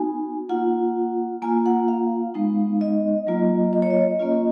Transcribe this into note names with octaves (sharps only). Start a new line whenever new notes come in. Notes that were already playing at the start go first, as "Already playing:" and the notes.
Already playing: B3 D#4 F#4 G#5
A#3 F4 F#5
A#3 F4 G#5
F#5
F5
G#3 B3 D#4
D#5
F#3 A#3 F4
D#5
C#5
D#5
A#3 C#4 F4